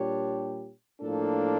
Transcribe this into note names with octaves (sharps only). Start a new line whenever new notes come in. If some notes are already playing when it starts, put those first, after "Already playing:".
Already playing: A#2 G3 D4 G4 C#5
A2 F3 A#3 D4 A4